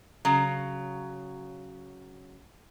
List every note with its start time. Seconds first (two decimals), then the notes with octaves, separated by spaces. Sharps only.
0.25 C#3 F#3